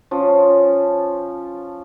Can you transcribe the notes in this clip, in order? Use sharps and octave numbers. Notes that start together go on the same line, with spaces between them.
F3 C#4